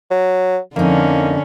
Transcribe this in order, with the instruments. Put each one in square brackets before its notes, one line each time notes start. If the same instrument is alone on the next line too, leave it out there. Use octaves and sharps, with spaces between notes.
[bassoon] F#3
[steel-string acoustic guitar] F2 D#4 [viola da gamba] D3 C#4 [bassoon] A#3